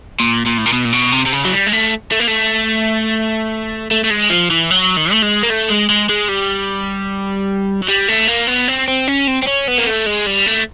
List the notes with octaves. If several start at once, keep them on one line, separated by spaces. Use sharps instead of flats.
A#2
A#2
A2
A#2
B2
A#2
B2
C3
C3
C#3
F#3
G3
G#3
A3
A3
A#3
A3
A3
A3
G#3
F3
E3
F#3
D#3
A3
G#3
A#3
A3
G#3
G#3
G#3
G3
F#3
G3
A3
A#3
B3
C4
C4
C#4
C4
C4
C#4
B3
A#3
A3
G#3
G3
A3